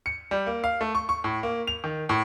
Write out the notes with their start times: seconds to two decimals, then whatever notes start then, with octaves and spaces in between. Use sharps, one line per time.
0.06 C#7
0.31 G3
0.47 A#3
0.64 F5
0.81 A3
0.95 C#6
1.09 C#6
1.24 A2
1.43 A#3
1.67 F7
1.84 D#3
2.09 A2